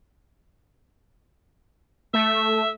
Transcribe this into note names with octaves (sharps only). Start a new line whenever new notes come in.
A3 E5